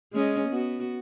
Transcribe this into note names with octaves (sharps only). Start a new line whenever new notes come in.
G#3 C#4 D#5
B3 F#4